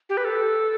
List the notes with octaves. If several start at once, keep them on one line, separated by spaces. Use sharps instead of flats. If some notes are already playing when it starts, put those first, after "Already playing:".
G4
B4
A4